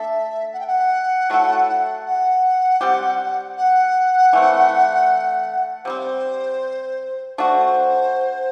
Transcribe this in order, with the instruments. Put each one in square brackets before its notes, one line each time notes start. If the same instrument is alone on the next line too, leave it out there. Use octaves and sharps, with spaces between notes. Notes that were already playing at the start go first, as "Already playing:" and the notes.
Already playing: [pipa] A3 D4 A4 [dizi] E5
[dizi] F#5
G5
F#5
[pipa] F#3 A3 E4 A4
[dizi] F#5
[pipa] G3 C4 G4
[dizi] F#5
[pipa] E3 A3 C4
[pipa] C3 G3 C4 [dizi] C5
[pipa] A3 D4 F#4 [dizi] C5